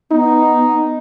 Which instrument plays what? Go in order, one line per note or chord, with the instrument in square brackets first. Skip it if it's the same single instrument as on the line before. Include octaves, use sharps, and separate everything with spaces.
[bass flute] B3 [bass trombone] D#4